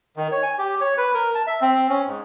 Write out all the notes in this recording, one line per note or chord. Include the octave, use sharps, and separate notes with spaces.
D#3
C#5
G#5
G4
C#5
B4
A#4
A5
E5
C4
C#4
G#2